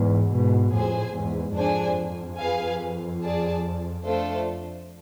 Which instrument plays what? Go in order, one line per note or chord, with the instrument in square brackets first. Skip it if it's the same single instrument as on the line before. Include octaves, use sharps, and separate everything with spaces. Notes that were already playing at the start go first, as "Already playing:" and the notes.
Already playing: [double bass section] E2 G#2
G#2 B2
[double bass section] F2 A2 [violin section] G#4 C5 G#5
[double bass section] E2 G#2
[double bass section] F2 [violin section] D4 G#4 C5 G#5
[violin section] G#4 B4 F5 G#5
G#4 D5 A5
A3 D4 F4 A4 C5